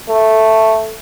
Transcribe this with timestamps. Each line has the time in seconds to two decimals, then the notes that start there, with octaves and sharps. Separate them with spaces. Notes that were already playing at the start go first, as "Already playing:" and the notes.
0.08 A3